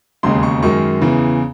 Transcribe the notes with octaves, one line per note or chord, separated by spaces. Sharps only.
E1 D#2 C#3 G#3 C6
C#6
F#2 D#3 G#3 C#6
E2 C#3 E3